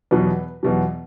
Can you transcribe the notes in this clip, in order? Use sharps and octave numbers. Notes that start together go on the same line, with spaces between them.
E2 B2 F#3 B4
E2 B2 F#3